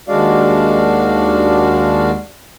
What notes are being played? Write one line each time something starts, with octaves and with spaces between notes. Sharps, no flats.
D#2 G#3 D4 F#4 D5 F5